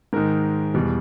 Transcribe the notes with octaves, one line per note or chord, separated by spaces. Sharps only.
G#2 D#3 G#3 A#4
E2 B2 G3